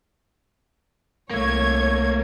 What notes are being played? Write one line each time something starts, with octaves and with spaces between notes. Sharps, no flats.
C2 A3 A#3 C#5 G#6